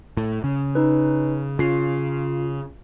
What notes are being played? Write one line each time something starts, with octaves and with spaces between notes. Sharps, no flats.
A2
C#3
D#4 B4
C#3 F4 C7